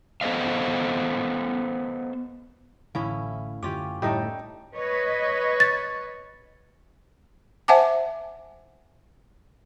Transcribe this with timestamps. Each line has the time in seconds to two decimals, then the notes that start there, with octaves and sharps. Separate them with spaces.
0.21 B3 A4 C5 D#5 F5
2.95 A1 A2 D3 E3 C#4 E4 F5
3.63 F#2 D3 C#4 F4 G4 D6
4.02 A2 G3 D#4 A4 D#5 G5
4.75 B4 C#5 D#5
5.60 A6
7.68 C5 E5 F#5 G#5 A5 D6